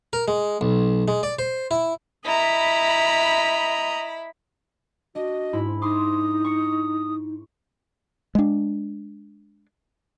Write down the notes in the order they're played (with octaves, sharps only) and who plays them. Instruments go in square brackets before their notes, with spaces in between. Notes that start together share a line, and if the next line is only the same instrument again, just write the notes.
[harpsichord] A#4
G#3
B1
G#3
D5
C5
E4
[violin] E4 B5 [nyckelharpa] D#5 A#5
[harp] D4 [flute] F#4 [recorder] D#5
[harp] G#2 E4 B5
[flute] D#4 [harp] C6 D6 [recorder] D#6
[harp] C#6 C#7
[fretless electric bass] G#3 D4